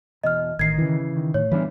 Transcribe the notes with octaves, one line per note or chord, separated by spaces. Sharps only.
E2 B2 D#5 F6
A1 D#3 D#5 G#6 C7
C#3 E3
D#3
A2 C#5
E3 G3 B3 D4 F4 B4